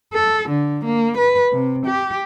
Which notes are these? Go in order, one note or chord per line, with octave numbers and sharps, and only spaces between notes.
A4
D3
A#3
B4
C3
G4